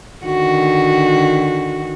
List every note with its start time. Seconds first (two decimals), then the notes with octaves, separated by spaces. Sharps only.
0.24 D3 D#3 F#4